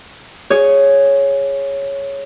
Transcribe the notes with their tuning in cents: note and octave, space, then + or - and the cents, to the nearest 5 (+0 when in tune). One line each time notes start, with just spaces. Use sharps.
G#4 +0 C#5 +0